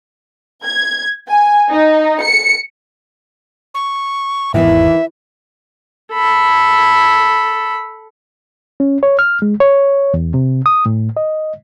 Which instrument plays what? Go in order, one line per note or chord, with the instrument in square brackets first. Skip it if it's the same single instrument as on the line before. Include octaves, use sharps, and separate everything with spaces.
[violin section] G#6
G#5
D#4
C#7
[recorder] C#6
[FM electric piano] G#1 E2 [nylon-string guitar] D#3 E3 [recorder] E5
[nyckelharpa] A4 B5
[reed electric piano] C#4
C#5
F6
G#3
C#5
E2
C3
D#6
A2
D#5